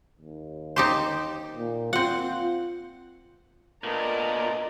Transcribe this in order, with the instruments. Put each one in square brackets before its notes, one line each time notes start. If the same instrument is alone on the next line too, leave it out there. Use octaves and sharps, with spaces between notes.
[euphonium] D#2
[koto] D#4 G4 C5
[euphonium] A#2
[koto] C4 F#5 [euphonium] F4
[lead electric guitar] A#2 [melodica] A3 B3 D4 [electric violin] A#4 D5 [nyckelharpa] D#5